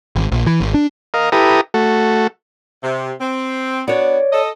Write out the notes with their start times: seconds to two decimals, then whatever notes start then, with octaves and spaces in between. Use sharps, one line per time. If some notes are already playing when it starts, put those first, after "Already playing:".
0.16 G#1
0.32 A#1
0.47 E3
0.61 G#1
0.74 D4
1.14 A#4 D#5 F5
1.32 E4 G4 A4 B4 A#5 D#6
1.74 A3 F#4 A4
2.83 C3
3.20 C4
3.88 B3 D4 F#4 C#5 D5
4.32 A4 D#5